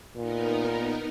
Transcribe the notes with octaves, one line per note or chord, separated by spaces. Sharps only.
A#2 B3 D#4 A#4